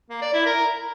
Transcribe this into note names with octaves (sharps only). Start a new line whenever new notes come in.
A#3
D5
E4
A#4